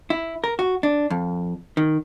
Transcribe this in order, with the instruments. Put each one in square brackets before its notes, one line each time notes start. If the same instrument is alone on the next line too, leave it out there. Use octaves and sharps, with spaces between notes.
[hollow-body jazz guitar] E4
A#4
F#4
D4
F2
D#3